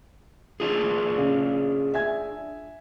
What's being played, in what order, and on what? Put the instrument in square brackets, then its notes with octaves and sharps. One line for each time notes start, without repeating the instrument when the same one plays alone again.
[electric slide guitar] D4 F4 G#4
[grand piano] C#3 D5 F5
E5 G#5 G#6